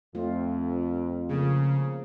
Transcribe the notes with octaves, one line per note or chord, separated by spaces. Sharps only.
F2 A3 C4 F4
C#3 F3 A#3 G#4